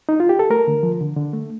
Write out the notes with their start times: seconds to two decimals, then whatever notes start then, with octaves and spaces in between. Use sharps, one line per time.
0.09 D#4
0.20 F4
0.29 G4
0.39 A4
0.50 A3 A#4
0.67 D3
0.83 F3
1.01 D3
1.17 D3
1.33 A3